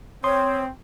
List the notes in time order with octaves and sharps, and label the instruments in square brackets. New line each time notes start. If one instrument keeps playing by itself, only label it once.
[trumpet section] C4 [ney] C#5 [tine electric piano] C6 D#6